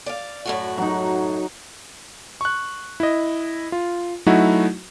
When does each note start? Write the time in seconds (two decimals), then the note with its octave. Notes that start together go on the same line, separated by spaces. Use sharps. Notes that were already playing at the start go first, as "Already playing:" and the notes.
0.06 D5 F5
0.46 F#2 A2 F#4
0.78 F#3 D#4
2.41 C#6 F#6
3.00 E4 D#5
3.72 F4
4.26 F#3 A3 D#4 E4 F#4